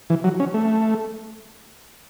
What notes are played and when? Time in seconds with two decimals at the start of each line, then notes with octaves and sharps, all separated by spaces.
0.10 E3
0.24 F#3
0.40 C#4
0.54 A3